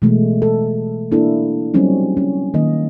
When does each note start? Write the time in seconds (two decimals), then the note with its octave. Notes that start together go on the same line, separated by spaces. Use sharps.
0.02 B2 E3 G#3 A3
0.42 A4
1.12 A#3 D4 E4 A4
1.74 F#3 G3 C4 C#4 D#4
2.17 C#4
2.54 D#3 A#3 D#5